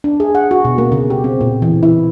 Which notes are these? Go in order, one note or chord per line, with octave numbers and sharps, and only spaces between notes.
D4
G#4
F#5
F#4
B2
A#3
C#3
G4
C4
A#2
E3
E4